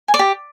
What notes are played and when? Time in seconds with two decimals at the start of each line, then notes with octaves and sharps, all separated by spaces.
0.08 G#5
0.14 D5
0.19 G4